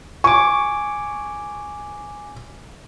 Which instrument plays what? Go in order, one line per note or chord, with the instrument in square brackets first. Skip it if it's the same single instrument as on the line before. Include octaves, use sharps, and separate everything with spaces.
[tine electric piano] G#5 D6 [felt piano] C#6